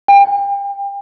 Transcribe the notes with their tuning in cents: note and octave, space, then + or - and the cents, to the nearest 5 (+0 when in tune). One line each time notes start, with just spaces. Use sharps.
G5 +35